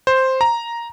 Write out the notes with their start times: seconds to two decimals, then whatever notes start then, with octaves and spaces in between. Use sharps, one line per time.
0.07 C5
0.41 A#5